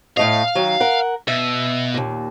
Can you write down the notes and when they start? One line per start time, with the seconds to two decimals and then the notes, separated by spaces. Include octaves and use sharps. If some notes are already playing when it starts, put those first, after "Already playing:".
0.17 A2 A3 D#5 F5
0.55 D#3 F#3
0.80 A#4 F#5
1.28 B2 E5
1.94 D#2 A#2